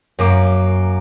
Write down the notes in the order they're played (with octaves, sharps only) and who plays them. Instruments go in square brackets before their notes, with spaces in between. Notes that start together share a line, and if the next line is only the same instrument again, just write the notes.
[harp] F#2 A#3 D6